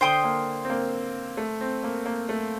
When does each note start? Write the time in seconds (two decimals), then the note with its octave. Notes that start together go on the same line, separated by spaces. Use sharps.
0.01 D3 C5 G5 C6 D#6
0.24 A#3
0.65 C4
0.70 A#3
1.37 A3
1.61 C4
1.84 A#3
2.06 A#3
2.29 A3